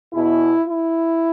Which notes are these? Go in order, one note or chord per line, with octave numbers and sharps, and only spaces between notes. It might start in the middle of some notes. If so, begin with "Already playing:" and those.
E2 B2 E4
E4